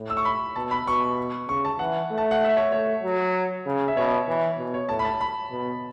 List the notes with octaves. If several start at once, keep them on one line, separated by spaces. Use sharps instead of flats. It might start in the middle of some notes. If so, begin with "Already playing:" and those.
Already playing: A2
E6
C#6
B5
B2 A5
B5
B2 C#6
C#3 C#6
A5
E3 F#5
A3
A5
F#5
E5
C#5
A3 C#5
F#3
C#3
E5
B2 C#5
E3
B2
C#5
A2 A5
B5
A5
B5
B2